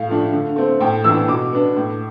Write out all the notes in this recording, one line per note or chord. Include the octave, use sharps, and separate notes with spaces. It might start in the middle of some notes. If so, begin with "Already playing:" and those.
Already playing: A2 F5
F3 A3 D4
D3
A3 C4
A2 G5
E3 B3 D4 E6
B2 D6
B3 D4
A2